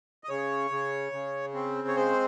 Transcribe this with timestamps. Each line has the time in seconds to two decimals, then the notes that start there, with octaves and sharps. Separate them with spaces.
0.24 D#5
0.29 C#3 C#5
0.71 C#3
1.12 C#3
1.54 C4
1.88 C#5
1.96 G#3 C5